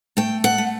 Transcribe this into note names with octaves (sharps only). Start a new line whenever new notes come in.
A3 G5
F#5
A3